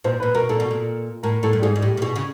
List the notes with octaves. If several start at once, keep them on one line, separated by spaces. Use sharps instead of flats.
A#2 C5
A#2 B4
B2 A#4
A#2 A4
B2
A#2
A2 A#4
A2 A4
G2
G#2 G#4
G#2
A2 G4
A#2
B2 G#4
C#3